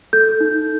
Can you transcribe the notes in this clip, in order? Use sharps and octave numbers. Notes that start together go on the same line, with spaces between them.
A4 G6
D#4